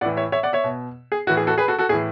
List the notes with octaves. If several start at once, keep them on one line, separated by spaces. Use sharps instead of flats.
A2 E3 D5 F#5
C#5 E5
C#5 E5
D5 F#5
C#5 E5
B2
G#4
A2 E3 F#4
G#4
F#4 A4
G#4 B4
F#4 A4
F#4 A4
A2 E3 G#4